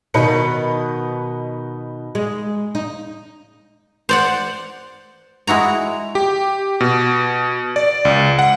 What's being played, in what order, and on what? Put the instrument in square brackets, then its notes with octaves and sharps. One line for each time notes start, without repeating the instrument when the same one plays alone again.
[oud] B2 D#3 [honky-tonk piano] D#4 B4 C#7
[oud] G#3
D#4
[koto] C5 D5 F#5
G#3 E4 F#4 A#5
[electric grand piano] G4
B2
D5
C#2
F#5